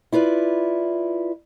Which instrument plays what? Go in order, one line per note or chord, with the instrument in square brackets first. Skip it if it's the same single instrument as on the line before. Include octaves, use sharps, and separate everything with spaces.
[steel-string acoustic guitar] E4 F4 B4 D5